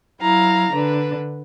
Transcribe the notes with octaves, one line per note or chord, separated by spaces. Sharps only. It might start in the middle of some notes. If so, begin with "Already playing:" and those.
F#3 E4 F5 A#5
D3 D4 B4